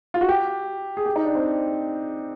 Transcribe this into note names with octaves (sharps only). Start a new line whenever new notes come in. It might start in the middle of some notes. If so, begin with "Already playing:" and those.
F4
F#4
G4
G#4
G4
D#4
D4
C4